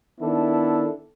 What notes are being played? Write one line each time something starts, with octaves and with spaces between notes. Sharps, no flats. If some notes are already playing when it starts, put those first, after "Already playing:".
D#3 B3 D4 E4 A4